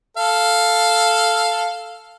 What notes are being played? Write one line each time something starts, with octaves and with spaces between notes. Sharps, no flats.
A4 F5